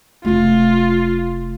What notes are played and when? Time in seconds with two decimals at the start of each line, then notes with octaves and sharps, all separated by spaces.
0.25 F1 A3 F4